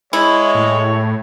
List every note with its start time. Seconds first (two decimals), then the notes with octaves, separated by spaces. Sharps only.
0.13 G#3 E4 C#5
0.55 A2